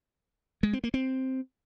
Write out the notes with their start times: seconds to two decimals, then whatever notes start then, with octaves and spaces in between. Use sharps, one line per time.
0.63 G#3
0.73 C4
0.84 A#3
0.94 C4